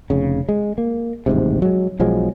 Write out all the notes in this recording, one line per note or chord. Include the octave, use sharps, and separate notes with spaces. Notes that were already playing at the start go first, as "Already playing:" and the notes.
F1 C#3
G#3
A#3
D#1 A1 G#2 C3
F#3 G#3
B1 F3 F#3 G#3